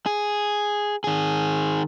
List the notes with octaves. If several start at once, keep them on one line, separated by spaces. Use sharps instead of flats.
G#4
D#3 G#4